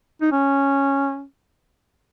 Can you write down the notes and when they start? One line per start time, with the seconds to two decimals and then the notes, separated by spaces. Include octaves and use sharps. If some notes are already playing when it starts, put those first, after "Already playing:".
0.22 D#4
0.32 C#4